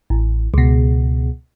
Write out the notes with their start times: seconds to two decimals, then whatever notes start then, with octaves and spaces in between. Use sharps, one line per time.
0.10 A1
0.54 C#2 B2